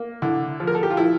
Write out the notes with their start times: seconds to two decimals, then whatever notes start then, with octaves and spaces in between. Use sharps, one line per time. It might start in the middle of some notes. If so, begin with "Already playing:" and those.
Already playing: A#3
0.22 D3 E4
0.60 F3
0.67 A#4
0.75 A4
0.83 G4
0.90 F4
0.97 F3 E4